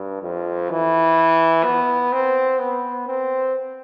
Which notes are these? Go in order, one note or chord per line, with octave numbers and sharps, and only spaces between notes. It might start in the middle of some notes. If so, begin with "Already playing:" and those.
Already playing: G2
F2
E3
B3
C4
B3
C4